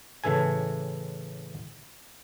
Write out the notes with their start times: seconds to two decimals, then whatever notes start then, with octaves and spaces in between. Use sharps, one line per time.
0.24 A2 C#3 E3 A4 G#5